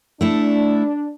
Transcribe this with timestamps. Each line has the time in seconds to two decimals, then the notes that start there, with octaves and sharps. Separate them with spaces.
0.21 A3 D4 E4